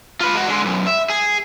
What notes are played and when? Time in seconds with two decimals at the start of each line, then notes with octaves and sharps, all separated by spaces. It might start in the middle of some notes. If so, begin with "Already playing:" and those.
0.21 F4 B4
0.35 G#3 F#4
0.47 D3 G#3
0.65 B1 F#2
0.87 E5
1.10 G#4